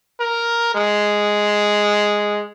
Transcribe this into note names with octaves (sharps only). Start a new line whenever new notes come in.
A#4
G#3